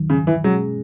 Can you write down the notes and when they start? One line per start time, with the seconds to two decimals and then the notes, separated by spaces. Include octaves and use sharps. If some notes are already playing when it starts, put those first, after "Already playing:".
Already playing: D#2 D#3 F#3
0.09 C#3
0.27 E3
0.44 B2 F#3 G#3 C#4 G#4